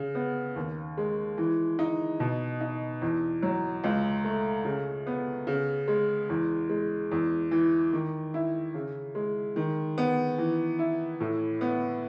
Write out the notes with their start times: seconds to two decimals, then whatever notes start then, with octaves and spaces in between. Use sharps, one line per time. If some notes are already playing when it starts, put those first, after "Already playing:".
Already playing: C#3
0.15 B3
0.56 D#2
0.98 G#3
1.38 E3
1.79 D#4
2.20 B2
2.61 D#4
3.02 E2
3.42 F#3
3.84 C#2
4.24 A3
4.65 C#3
5.07 B3
5.47 C#3
5.88 G#3
6.29 E2
6.69 G#3
7.11 E2
7.51 E3
7.93 D#3
8.34 E4
8.74 C#3
9.15 G#3
9.56 D#3
9.98 B3
10.38 E3
10.79 E4
11.20 A2
11.61 B3